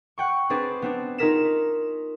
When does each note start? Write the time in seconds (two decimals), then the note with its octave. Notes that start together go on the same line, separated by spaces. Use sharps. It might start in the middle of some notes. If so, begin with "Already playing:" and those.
0.18 F#5 G5 C#6
0.50 C4 D4 G#4 B4 D5
0.82 B3 C4 D4
1.18 D#4 F4 G#4 A#4 B6 E7